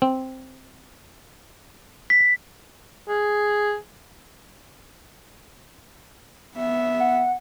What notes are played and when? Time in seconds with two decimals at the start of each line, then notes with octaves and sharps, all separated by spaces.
0.02 C4
2.10 B6
3.09 G#4
6.55 B3 E5
7.00 F#5